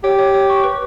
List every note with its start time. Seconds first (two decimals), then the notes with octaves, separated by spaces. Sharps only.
0.04 G4 C#5
0.19 C#5
0.34 C#5
0.49 C#6
0.64 B4